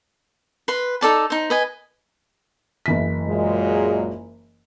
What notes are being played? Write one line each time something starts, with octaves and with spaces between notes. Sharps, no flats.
B4 C6
D#4 A4 D5 A5
D#4 C5
B4 D#5 G#5
F#1 E3 B6
A#2 F#3 G#3